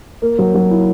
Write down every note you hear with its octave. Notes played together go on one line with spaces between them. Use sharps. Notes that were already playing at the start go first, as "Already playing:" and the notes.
A#3
F#3
F#3
E4